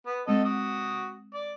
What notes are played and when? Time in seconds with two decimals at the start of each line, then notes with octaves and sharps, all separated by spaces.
0.06 B3
0.27 G#3 C4 A4 D#5
0.45 F#4 D#6
1.34 D5